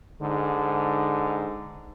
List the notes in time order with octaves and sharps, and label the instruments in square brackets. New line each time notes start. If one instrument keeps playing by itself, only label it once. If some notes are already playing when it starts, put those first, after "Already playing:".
[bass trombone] G#2 [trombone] D3